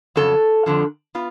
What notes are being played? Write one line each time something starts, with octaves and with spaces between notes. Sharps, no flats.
F2 C#3 F#3 A4
F2 D3 F3
B3 F4